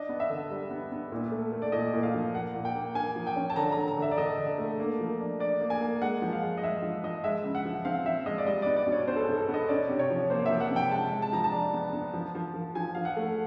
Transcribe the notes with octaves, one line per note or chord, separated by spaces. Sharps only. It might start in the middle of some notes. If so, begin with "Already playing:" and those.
Already playing: D4 D#5
B3
E5
D3
G3
B3
B3
A#2
A3
A3
D5
A#2 D#5
A#2
F5
F3
A#3 F#5
A#2
G5
A#3
A#3 G#5
F3
G5
C#4
A5
D3 A#5
D3 A#5
A#5
D3 E5
D5
D3 D#5
D3
A3
A#3
F3
D4
D4 D5
A#3
G#5
A#3
G#3 F#5
F3
F5
G#3
D#5
G#3 E5
F3
F3 D#5
G#3 E5
C#3
F#5
F3
C4 F5
F3 E5
G#3 D#5
D5
G3 D#5
B3 D5
D5
B2
C#5
B3 C5
A4
G#4
B2
A4
B3
D#5
C#4 D5
C3
C#5
F3
A#3 C5
F3 E5
F#5
C3
G5
G#3 A5
G#3
A5
F3 A#5
A5
D4
B3
B3
F3
F3
F3
F3 G#5
F3 F5
F#5
A3